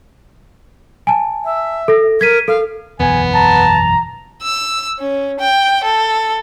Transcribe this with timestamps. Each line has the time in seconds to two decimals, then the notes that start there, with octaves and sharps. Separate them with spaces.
1.07 G#5 A5
1.45 E5
1.88 A4 A#6
2.21 A#4 G#6 B6 D#7
2.48 A4 F5
3.00 F#1 B1 E2 B3 G#5
3.34 A5 A#5
4.43 E6
4.99 C#4
5.40 G5
5.84 A4